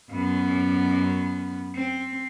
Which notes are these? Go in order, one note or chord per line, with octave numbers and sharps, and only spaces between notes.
F#2 B3
C4